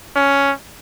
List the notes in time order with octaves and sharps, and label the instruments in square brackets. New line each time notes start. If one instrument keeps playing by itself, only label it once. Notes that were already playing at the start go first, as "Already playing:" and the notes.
[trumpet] C#4